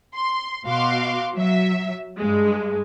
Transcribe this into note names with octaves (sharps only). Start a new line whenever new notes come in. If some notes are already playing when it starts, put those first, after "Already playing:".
C6
B2 F#4 F5 C6 D6
F#3 E5
G2 G#3